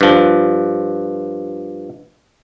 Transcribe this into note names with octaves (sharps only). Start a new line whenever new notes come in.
G2 F3